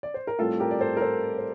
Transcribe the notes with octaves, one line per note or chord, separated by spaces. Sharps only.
D5
C5
A#4
A2 G3 C4 F4 A4
G4 A#4
D5
A4 C5
A#4
A4 C5
C5